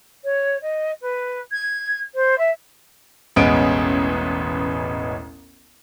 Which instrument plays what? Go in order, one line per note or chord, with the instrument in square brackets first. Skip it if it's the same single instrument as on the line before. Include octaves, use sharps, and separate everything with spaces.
[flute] C#5
D#5
B4
G#6
C5
E5
[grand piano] E1 A1 G#3 B3 C#4 D7